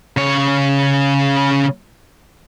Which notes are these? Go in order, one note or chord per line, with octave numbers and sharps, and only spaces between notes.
C#3 C#5